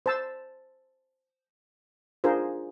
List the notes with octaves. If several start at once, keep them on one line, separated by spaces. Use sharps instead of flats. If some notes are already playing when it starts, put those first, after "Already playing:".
C5 A5 E6
D4 F4 G#4 A#4 C5